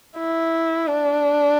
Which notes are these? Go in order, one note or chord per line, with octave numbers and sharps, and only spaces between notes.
E4
D4